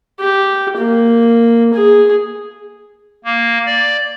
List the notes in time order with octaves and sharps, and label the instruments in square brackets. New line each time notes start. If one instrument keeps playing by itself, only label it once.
[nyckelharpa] G4
A#3
G#4
[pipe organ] A#3
D5